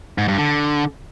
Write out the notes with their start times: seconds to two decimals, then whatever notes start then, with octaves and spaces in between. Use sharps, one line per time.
0.18 G#2
0.28 G2
0.38 D3